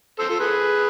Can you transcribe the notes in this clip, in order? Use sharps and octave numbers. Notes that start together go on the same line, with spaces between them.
A4 C5
F4 A4
G#4 B4